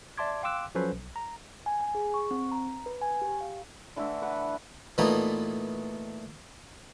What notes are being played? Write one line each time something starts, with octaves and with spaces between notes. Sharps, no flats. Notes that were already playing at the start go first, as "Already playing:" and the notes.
D5 E5 A5 C6 D6 G#6
F5 G5 C6 D6 E6 F#6
F3 F#3 C#4 A4 B4 C5
B1
A#5
G#5
G#5
G#4
C#6
C4
A#5
B4
G#5
G4
F5
D3 E3 A3 E4
B4 F#5
A#2 E3 A3 B3 D#4